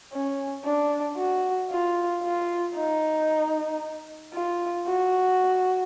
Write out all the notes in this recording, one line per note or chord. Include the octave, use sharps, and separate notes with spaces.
C#4
D4
F#4
F4
F4
D#4
F4
F#4